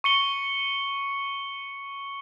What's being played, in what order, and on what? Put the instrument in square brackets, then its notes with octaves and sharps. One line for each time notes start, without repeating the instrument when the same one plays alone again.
[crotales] C#6 C#7 G7